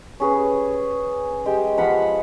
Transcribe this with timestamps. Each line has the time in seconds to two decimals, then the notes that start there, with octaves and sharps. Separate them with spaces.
0.20 C#4 G#4 B4
1.46 G#3 G4 G5
1.77 F3 F5 F#5 B5